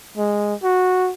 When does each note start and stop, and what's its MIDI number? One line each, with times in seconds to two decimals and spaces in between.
0.17 0.55 56
0.63 1.11 66